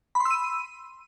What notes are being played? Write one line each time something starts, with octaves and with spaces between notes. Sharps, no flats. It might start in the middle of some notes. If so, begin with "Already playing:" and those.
B5
C6
E6
D#7